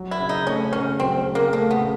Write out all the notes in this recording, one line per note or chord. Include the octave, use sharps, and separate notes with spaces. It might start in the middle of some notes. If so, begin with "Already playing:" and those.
Already playing: F#3
E4
C#3
D#4
A3 C#4
C#3 C#4
F#3 C4
C#3
A#3
A3 A#3
B3
C#3